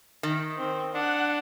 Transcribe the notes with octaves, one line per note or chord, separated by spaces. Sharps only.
D#3
C4
D4 F#5